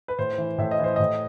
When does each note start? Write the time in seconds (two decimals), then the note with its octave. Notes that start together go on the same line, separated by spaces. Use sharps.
0.08 B4
0.19 A2 C5
0.38 E3
0.58 A2 E5
0.71 D#5
0.79 E3 C5
0.96 A2 D#5